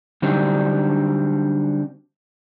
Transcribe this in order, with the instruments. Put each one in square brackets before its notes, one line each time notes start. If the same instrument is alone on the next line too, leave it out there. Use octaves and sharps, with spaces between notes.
[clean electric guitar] D3 F#3 G3 C4 D4 D#4